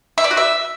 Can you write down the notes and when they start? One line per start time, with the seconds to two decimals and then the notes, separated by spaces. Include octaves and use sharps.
0.18 E5
0.24 D5
0.31 F#4
0.37 E5